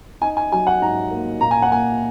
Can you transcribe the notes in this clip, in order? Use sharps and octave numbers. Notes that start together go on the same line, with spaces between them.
D#4 G#5
G#5
F#3 G#5
F#5
G#2 A#5
A#3
A#2 A#5
G#5
F#5
A#3 G#5